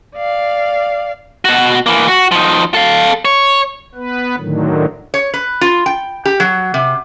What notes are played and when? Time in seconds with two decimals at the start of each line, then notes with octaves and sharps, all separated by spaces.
0.17 D5 F5
1.45 B2 F#4
1.86 E3 A#3
2.08 F#4
2.32 F3 D#4
2.74 A4 F5
3.25 C#5
3.95 B3 B4
4.37 A2 D3 D#3 F#3
5.14 C#5
5.34 B4
5.61 F4
5.86 G5
6.25 G4
6.40 F#3
6.74 C3